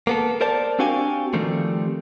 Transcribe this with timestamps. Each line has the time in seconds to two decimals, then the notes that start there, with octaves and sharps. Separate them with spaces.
0.07 A#3 B3 A4
0.41 A#4 C5 D5 A5
0.79 C4 D4 F#4 G4 F5 G#5
1.33 D#3 F3 G3 A3 C4